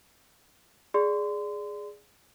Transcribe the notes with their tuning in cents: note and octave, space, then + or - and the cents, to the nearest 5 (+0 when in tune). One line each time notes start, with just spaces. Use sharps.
G#4 +0 D5 +0 C6 -30